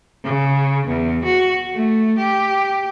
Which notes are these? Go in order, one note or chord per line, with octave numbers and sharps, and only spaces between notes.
C#3
E2
F#4
A3
G4